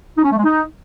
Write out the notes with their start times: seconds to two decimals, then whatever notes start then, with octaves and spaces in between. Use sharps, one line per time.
0.16 D#4
0.23 C#4
0.30 A3
0.37 G#3
0.44 D#4